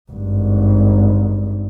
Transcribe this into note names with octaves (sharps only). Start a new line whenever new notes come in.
G#1 G2